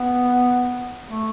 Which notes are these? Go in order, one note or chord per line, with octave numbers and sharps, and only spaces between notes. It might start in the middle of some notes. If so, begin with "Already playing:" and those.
Already playing: B3
A3